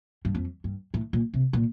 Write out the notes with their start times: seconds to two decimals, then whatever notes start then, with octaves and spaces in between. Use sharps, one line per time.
0.25 G2
0.35 F2
0.64 G2
0.94 A2
1.13 A#2
1.34 C3
1.53 A#2